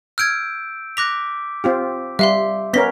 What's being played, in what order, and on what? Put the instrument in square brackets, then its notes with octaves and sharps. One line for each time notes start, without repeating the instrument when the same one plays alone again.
[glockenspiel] E6 G6 D7 [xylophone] F6 G#6
[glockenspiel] D6 B6 [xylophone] F#6 A#6 F7
[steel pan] C4 F4 G4
[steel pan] G3 [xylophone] E5 F5 C6
[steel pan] B3 C#4 A#4 [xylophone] A#6 B6 G7